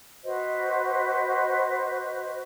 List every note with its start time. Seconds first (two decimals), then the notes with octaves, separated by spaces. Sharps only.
0.24 F#4 B4 C5 D#5